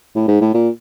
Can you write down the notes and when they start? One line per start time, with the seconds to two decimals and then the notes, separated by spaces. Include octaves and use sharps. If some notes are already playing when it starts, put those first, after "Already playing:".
0.15 A2
0.28 G#2
0.41 A2
0.54 A#2